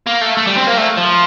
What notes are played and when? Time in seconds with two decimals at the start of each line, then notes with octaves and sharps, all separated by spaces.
0.07 A#3
0.22 A3
0.37 A3
0.47 G3
0.57 C4
0.67 A#3
0.78 A3
0.98 F3